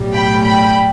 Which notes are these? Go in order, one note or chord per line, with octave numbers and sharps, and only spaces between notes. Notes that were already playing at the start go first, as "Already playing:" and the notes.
Already playing: B1 A2 G3
G5 B5
G5 B5